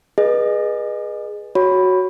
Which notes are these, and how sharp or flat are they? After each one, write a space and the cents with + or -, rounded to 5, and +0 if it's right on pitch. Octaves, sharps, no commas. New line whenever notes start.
G#4 +0 B4 -25 D#5 -25
F#4 +0 C#5 +0 B5 +5